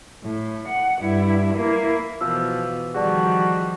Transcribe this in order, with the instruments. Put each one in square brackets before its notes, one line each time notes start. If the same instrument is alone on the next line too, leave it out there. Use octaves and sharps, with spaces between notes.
[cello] A2
F#5
G2 E4
A#3 E4
[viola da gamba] B2 E3 [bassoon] F3 [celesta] E6
[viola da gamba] D#3 F3 G3 [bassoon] F#4 [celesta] G#4 D5 A5